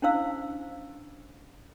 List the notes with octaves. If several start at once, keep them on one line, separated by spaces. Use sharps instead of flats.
C#4 D4 E4 C5 F5 E6